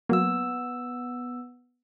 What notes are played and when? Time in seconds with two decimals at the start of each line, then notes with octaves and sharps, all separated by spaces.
0.09 F#3 A#3 B3 E6